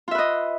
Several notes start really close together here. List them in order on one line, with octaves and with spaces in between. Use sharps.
F4 E5 B4 D#5